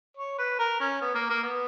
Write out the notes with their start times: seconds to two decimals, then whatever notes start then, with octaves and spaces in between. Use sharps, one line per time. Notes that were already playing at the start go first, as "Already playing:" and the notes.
0.17 C#5
0.39 B4
0.60 A#4
0.80 C#4
1.02 B3
1.15 A#3
1.30 A#3
1.44 B3